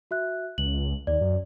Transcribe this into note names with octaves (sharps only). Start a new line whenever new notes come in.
F#4 E5 F#6
C#2 F#7
D#2 D5
F#2